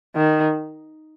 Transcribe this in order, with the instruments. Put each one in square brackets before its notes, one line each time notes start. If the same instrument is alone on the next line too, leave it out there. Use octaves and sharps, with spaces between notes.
[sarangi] D#3